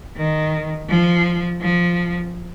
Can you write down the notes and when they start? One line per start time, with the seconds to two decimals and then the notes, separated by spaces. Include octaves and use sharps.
0.17 D#3
0.89 F3
1.62 F3